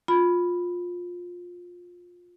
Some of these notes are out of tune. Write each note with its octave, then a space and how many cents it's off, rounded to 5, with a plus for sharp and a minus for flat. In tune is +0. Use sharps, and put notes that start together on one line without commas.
F4 +20 B5 +0